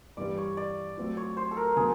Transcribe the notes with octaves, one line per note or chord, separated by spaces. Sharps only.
G2 E3 G3 D5
C#5
D5
F#3 A3 C4 F4
C#5
C5
A4
A#4
D3 F#3 B3 G#4